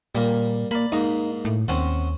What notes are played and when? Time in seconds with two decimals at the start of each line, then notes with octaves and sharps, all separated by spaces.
0.15 A#2 G3 A#3 A#4
0.71 A#3 D5 B5
0.92 G#2 A#3 D#4
1.45 A2
1.68 D#2 C4 C#4 F#5